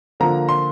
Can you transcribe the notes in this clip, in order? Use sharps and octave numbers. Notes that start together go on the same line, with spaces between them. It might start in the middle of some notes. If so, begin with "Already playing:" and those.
D3 F3 A#3 A#5
C6